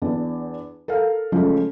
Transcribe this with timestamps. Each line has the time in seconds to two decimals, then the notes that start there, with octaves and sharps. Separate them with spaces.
0.02 E2 D4
0.88 A4 A#4 F5
1.32 C#3 F3 G#3 A3 F4